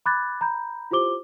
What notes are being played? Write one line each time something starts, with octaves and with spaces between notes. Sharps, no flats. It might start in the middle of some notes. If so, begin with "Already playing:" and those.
B5 D6 F#6 G#6 A6
A#5 B5 G6
E4 F4 G4 C5 D6 G7